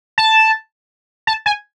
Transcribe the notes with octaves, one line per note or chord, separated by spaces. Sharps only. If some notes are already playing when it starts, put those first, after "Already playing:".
A5
A5
G#5